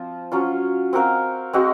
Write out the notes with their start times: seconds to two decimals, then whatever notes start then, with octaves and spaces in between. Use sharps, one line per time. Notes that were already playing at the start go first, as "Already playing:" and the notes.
Already playing: F3 C4 F4
0.32 F#3 C#4 F4
0.93 C4 F#4 A#4 F5
1.53 G#3 C4 F#4